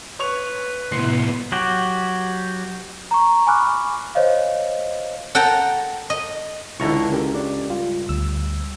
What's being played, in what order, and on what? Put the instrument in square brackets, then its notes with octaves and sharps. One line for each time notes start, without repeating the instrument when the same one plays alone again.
[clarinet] B4 [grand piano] C#5 C#6 F7
[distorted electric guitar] C2 A2 [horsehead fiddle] B3 E4 [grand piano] C6 C7 C#7
[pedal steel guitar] F#3 F#4 G4
[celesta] A#5 C#6
G#5 B5 C#6 D6 F6 F#6
C5 C#5 D#5 F5
[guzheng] A4 F#5 G5 A5 A#5
D#5
[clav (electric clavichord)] C#2 A#5 [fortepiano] D3 E3 E4 [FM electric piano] A5 C#6
[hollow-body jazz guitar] C#3 G4 A4 [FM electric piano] A#4
[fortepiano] D4
[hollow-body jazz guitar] G2 [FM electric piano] F4
[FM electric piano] D2 E6